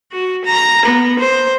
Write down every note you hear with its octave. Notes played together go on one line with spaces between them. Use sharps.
F#4
A#5
B3
C5